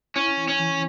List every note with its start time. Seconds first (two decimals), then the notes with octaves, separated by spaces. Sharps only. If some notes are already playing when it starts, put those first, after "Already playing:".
0.16 C#4 E4
0.37 E3
0.48 C#4
0.59 E3